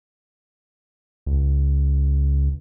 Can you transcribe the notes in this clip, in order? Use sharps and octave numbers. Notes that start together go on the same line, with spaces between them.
C#2